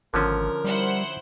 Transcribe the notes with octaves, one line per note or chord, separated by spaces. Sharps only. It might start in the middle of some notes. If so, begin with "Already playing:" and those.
G#1 D3 F3 C#4 A#4
G3 E4 C5 F#5